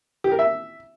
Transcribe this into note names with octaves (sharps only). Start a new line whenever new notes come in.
G4
A#4
E5